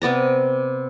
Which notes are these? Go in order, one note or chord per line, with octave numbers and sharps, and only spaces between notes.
C3 B3 D5 A#5